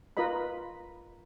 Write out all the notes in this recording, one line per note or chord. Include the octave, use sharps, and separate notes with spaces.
F4 A#4 B4 D#5 B5